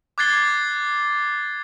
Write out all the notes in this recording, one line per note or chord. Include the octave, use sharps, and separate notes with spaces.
D6 F#6 G#6 A6 C7 G7